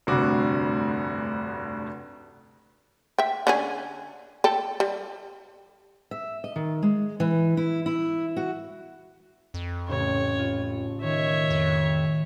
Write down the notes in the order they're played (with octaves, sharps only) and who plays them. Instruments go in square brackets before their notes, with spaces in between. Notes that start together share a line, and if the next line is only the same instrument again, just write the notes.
[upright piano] F1 D2 G2 C3 F#4 D6
[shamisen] E5 G5
D3 C#4 G#4
A4 G5
G3
[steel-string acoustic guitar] E5
D#5
D#3
G#3
E3
E4
E4
F#4
[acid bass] F2
[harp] A1 C#3 [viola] C#5
[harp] F4
[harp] D#3 [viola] C#5 E5
[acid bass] F2